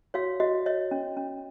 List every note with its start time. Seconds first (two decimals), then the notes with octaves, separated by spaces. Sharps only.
0.14 F#4 C#5 F5
0.40 F#4 D#5
0.66 C#5 D#5
0.91 C#4
1.17 C#4